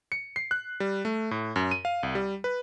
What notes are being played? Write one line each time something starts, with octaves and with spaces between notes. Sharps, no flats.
C#7
C7
F#6
G3
A3
A2
F#2
D#7
F5
C2
G3
B4